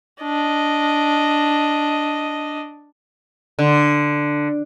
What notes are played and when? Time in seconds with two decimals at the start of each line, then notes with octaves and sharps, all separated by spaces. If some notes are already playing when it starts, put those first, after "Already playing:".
0.22 D4 D#5
3.59 D3